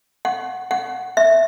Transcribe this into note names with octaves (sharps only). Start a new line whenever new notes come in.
F#5
F#5
E5